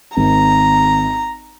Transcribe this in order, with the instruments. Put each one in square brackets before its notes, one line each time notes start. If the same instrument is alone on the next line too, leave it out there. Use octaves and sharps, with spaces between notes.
[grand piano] G#1 [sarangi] A#5